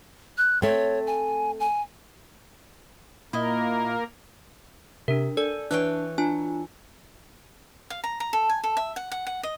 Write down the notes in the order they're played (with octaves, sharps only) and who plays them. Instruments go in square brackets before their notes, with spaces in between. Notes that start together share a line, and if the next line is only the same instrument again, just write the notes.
[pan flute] F#6
[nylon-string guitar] A3 C4 [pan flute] C#5
[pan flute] G#5
G#5
[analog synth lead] A#2 [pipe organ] A#3 A#4 [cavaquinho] E4 D#5
[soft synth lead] C3 [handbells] D4 A#4
[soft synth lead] A4 [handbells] D5 [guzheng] G#5
[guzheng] E3 C#5 G5 [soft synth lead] D4 [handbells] F#6
[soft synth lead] D4 [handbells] F4 G#5
[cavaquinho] F5
A#5
A#5
A4
G#5
A4
E5
F#5
F#5
F#5
D#5